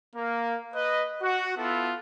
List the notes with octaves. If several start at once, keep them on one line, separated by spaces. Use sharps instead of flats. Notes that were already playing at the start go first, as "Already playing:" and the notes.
A#3
B4 D#5
F#4
B3 E4 F4 A4